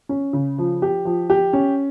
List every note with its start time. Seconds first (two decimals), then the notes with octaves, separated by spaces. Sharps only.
0.09 C#4
0.33 C#3
0.58 F3
0.82 G4
1.05 F3
1.30 G4
1.53 C#4